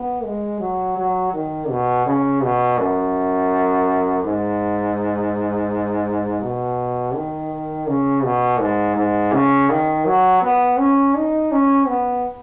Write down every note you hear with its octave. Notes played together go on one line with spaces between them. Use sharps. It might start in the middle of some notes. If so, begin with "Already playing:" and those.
Already playing: B3
G#3
F#3
F#3
D#3
B2
C#3
B2
F#2
G#2
B2
D#3
C#3
B2
G#2
G#2
C#3
D#3
F#3
B3
C#4
D#4
C#4
B3